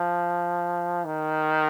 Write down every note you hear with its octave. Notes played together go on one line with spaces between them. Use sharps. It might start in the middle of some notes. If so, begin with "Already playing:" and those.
Already playing: F3
D#3